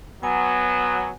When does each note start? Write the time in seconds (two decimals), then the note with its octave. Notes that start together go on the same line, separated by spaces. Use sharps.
0.23 F#3 B3 G#5